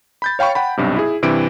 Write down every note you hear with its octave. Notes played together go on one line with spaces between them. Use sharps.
B5 G6 A6
C#5 F5 G5 B5 C#6
F#5 G5 B5
B1 G2 C3
E4 G#4
G2 C3 E3 D7